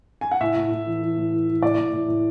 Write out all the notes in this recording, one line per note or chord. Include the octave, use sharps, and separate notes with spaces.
G#5
F#5
A2 E5
A2
A2
E3
E3
A2
E3
E3
A2 D5
A2
A2
A2